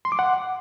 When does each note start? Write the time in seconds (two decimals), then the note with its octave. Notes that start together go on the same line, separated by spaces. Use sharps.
0.05 C6
0.12 D6
0.19 F#5